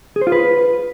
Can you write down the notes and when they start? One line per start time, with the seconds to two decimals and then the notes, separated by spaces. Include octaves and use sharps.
0.16 G#4
0.21 C5
0.27 F4
0.32 B4